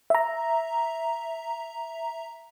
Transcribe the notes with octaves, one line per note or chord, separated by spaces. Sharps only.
E5 A#5